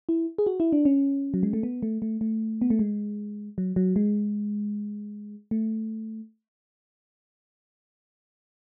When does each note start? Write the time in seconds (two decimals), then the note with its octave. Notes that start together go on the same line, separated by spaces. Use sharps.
0.09 E4
0.38 G#4
0.46 F#4
0.60 E4
0.72 D4
0.85 C#4
1.34 F#3
1.43 G#3
1.53 A3
1.63 B3
1.83 A3
2.02 A3
2.21 A3
2.61 B3
2.70 A3
2.79 G#3
3.58 F#3
3.76 F#3
3.96 G#3
5.51 A3